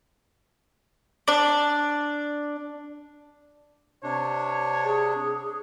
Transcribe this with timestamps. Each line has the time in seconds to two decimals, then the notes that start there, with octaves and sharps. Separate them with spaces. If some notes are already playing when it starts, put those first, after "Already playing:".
1.28 D4 D5
4.04 C3 D4 C#5
4.84 G#4